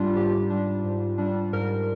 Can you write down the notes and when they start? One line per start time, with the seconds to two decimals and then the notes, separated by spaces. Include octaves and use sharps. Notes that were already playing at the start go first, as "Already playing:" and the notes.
Already playing: G#2 G3 D4 F4 G4
0.16 G#2 G4
0.50 G3 D4
0.84 G#2
1.18 G3 D4
1.53 G#2 A#4